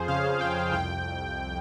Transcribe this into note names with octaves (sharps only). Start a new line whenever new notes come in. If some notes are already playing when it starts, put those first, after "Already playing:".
Already playing: F2 F3 G#4 C5
C#3 F5
F2 G5
C2 G5